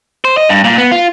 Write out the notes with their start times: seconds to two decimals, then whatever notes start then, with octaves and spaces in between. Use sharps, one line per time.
0.25 C5
0.37 D#5
0.49 G2
0.64 A#2
0.78 B3
0.92 F4